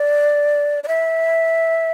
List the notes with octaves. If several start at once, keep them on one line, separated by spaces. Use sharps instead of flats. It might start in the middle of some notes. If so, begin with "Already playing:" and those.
Already playing: D5
D5
E5